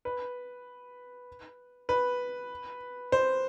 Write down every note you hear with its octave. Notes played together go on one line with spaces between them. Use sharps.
B4
B4
C5